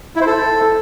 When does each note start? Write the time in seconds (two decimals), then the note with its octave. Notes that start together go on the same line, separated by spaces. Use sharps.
0.16 E4
0.21 C5
0.26 A4